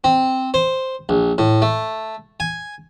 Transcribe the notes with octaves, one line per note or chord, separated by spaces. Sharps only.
C4
C5
A#1
A2
A3
G#5